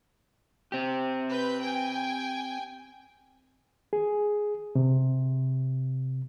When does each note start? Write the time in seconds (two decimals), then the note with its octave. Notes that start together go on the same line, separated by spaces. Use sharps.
0.72 C4 G4
1.28 B4 G6
1.60 G5 G#5
3.93 G#4
4.75 C3